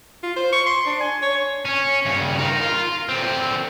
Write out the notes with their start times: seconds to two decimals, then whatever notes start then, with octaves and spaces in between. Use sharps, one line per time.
0.23 F4
0.36 C5
0.53 C#6
0.66 C6
0.86 D4
1.00 G#5
1.22 C#5
1.65 C#4
2.06 G2 C#3
2.39 D#4 A#4
2.61 F4
3.09 D3 C4